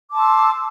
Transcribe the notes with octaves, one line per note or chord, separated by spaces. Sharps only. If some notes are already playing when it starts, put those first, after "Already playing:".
A5 C6 D6 E6